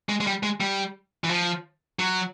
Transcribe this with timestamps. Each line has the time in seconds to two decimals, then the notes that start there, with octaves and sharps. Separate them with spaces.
0.09 G#3
0.21 G#3
0.27 G3
0.43 G#3
0.61 G3
1.24 E3
1.29 F3
1.99 F#3